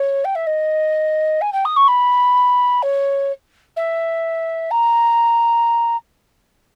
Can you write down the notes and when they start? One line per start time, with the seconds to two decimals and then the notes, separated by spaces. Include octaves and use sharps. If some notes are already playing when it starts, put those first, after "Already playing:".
Already playing: C#5
0.25 G5
0.35 E5
0.47 D#5
1.41 G#5
1.53 G5
1.65 D#6
1.77 C#6
1.88 B5
2.83 C#5
3.77 E5
4.71 A#5